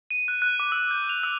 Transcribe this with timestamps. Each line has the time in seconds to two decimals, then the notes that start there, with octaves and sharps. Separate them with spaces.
0.10 D#7
0.28 F#6
0.42 F#6
0.60 D6
0.72 E6
0.91 G6
1.09 F7
1.23 E6